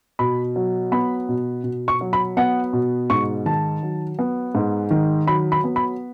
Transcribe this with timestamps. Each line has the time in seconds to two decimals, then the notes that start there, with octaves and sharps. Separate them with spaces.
0.19 B2 B5
0.56 F#3
0.92 B3 B5
1.29 B2
1.64 B2
1.88 C#6
2.01 F#3
2.13 B5
2.37 B3 F#5
2.73 B2
3.10 G#2 C#6
3.45 D#3 A5
3.83 F#3
4.19 B3
4.55 G#2
4.91 D#3
5.27 F#3 B5
5.52 B5
5.64 B3
5.76 B5